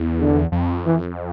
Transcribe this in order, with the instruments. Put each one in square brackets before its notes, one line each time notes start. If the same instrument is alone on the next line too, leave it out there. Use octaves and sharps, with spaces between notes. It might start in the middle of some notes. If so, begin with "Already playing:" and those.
Already playing: [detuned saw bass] E2
[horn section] D3
[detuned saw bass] F2
[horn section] E3